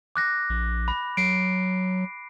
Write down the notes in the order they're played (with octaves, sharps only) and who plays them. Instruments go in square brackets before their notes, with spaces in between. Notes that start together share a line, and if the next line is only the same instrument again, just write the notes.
[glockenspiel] D6 F#6 A#6
[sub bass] A#1
[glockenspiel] B5
[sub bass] F#3 [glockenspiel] C7 D7